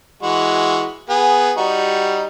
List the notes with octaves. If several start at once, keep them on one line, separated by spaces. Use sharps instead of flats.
E3 G#3 F#4
B3 G#4
G3 D#4 F#4